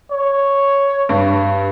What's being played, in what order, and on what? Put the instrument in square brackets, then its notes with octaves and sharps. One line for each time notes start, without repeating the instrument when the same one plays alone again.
[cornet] C#5
[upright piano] G2